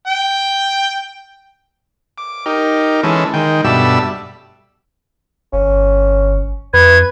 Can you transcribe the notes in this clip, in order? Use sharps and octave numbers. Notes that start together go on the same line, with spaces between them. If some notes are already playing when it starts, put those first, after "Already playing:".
G5
D6
D#4 G4 A#4
E3 G#3 C#4 A4
D#3 G#3 G5
G2 B2 G3 A4 E5 E6
G1 C#4
F2 B4 G#6